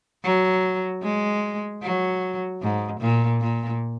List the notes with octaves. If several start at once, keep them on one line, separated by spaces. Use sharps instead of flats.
F#3
G#3
F#3
G#2
A#2
A#2